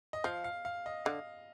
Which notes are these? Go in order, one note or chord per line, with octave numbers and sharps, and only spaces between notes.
D#5
F3 F5
F5
F5
D#5
D3 F5